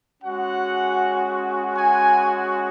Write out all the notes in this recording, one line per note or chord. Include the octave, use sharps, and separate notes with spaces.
G#3 C#4 F#4 F#5
G#5